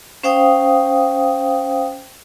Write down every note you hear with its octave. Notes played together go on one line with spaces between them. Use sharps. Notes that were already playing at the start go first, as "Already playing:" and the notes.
C#4 C5 F5 G5 D#6